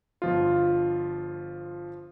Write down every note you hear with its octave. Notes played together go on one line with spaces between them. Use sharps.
G1 F3 F4